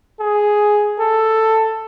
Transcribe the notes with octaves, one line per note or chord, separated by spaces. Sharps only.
G#4
A4